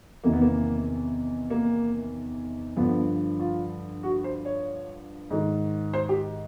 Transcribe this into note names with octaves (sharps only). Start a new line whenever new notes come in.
E2 C3 D#3 A#3
B3
A#3
A#3
G2 D3 F3 B3
F4
F#4
C5
C#5
G#2 D#3
C5
G4